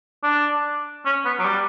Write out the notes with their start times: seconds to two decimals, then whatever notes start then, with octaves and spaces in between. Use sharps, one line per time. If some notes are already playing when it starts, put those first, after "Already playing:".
0.23 D4
1.05 C#4
1.25 B3
1.39 F#3
1.45 G3